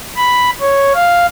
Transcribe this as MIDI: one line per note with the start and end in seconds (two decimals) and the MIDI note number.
0.16 0.50 83
0.60 0.92 73
0.94 1.26 77